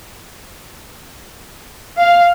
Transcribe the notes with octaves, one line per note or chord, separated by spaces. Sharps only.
F5